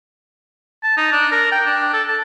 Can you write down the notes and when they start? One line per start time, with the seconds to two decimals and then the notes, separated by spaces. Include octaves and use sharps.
0.84 A5
0.97 D#4
1.12 D4
1.32 A#4
1.52 G5
1.66 D4
1.93 A4
2.08 A5